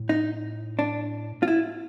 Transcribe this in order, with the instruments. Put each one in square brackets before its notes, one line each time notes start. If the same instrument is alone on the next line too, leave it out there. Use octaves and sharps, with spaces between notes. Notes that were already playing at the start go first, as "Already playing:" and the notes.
Already playing: [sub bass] A2
[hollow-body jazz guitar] D#4
D4
F4
E4